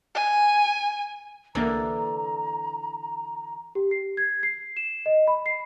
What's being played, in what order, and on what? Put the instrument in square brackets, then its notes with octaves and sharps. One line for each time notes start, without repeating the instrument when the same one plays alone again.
[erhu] G#5
[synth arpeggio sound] C2 A#3 [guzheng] D3 E3 A4 [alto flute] A#5
[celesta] G4
C7
G#6
C7
E7
D#5
B5
C7